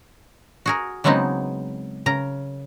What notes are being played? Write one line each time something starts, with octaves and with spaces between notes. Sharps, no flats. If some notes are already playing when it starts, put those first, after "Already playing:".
F#4 G#4 A#4
C#3 F#3 G#3 B3 C4 D#4
C#3 A#4 A#5